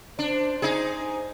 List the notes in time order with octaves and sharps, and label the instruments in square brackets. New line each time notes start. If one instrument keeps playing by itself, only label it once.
[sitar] D4 [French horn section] C5
[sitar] D#4 G#4